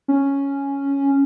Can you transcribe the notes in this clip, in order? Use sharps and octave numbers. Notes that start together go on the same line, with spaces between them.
C#4